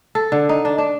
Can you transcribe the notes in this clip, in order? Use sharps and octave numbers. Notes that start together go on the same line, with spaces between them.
A4
D3
D#4
D4
D4